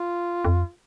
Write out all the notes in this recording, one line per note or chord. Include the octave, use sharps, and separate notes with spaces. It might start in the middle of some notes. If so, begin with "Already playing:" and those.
Already playing: F4
F2